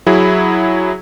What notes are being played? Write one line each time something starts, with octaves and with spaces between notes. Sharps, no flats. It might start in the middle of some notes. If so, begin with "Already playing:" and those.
F#3 E4 G#4